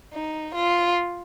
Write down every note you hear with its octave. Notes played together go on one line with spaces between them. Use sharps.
D#4
F4